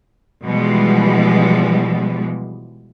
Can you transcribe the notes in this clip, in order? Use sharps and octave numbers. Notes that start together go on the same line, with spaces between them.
B2 E3 F3 G3 G#3